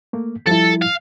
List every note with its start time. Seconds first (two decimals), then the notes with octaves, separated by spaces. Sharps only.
0.13 A3 A#3
0.47 F3 G3 E4 A4
0.82 F5